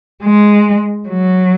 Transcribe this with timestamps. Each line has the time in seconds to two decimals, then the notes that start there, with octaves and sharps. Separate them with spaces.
0.23 G#3
1.08 F#3